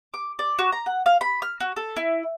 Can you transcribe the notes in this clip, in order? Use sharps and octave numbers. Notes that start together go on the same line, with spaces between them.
D6
D5
F#4
A#5
F#5
F5
B5
F6
F#4
A4
E4